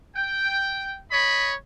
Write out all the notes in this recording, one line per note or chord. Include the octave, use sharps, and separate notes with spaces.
G5
C#5 D#5 B5